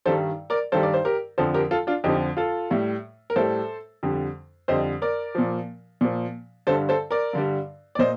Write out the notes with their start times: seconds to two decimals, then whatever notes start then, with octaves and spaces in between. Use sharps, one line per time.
0.06 G2 D#3 G3 A4 C5
0.50 A#4 D5
0.72 G2 D#3 G3 A4 C5
0.83 D5
0.94 C5
1.05 G4 A#4
1.38 F2 D3 F3 A4 C5
1.54 G4 A#4
1.71 F4 A4
1.87 D4 F4
2.04 F2 D3 F3 D#4 G4
2.37 F4 A4
2.70 A2 G3
3.30 A#4
3.36 A2 G3 A4 C5
4.03 F2 D3 G3
4.68 F2 D3 G3 C5 D#5
5.02 A#4 D5
5.35 A#2 F3
6.01 A#2 F3
6.67 G2 D3 G3 A4 C5
6.89 A4 C5
7.11 A#4 D5
7.33 G2 D3 G3
7.95 D5
7.99 A#2 C5 D#5